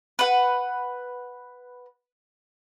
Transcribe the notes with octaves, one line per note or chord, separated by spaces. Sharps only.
B4 F#5